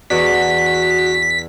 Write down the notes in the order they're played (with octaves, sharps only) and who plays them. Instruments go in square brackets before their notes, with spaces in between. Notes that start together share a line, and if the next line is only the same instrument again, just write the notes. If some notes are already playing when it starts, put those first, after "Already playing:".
[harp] E2 D5 [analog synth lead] F#4 [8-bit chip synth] B6